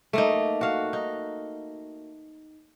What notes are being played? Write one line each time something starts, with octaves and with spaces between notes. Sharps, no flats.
A3 A#3 D#4
F#4 F5
D#4